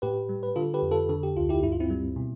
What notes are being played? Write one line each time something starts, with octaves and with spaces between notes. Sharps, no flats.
A2 G4 B4
G3
B4
D3 F4 A4
G4 B4
F2
F4 A4
D3 A4
G4
D2 F4
E4 G4
G2 E4
F4
C4 E4
G3
B2